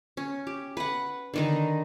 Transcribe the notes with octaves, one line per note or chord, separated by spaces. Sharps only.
C#4
G4
B4 F#5
D3 D#3 D#4